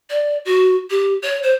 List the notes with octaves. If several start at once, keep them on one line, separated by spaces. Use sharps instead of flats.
D5
F#4
G4
C#5
C5